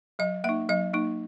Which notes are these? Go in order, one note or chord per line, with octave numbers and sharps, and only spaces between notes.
F#3 D#5
A#3 D#4 E5
F#3 D#5
A#3 D#4